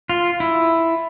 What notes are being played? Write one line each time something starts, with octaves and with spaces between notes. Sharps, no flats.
F4
E4